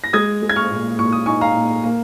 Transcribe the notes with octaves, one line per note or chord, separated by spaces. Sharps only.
A#6
G#3 D#6 G#6
G#3
G#6
C#6 F6
A#2
A#2 C#6
D#6
D#4 G#5 C#6
F5 A#5
A#2
A#3